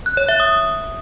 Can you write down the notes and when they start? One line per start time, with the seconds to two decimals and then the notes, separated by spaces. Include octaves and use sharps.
0.06 F#6
0.17 C#5
0.28 E5
0.40 D#6